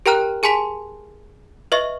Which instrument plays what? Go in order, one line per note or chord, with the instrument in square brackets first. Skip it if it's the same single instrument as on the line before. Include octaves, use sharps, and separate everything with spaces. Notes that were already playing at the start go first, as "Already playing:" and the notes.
[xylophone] G4 A#4 G5 A#5 F6 F#6
G#4 G#5 A5 C6 B6 F7
B4 D#5 E5 C#6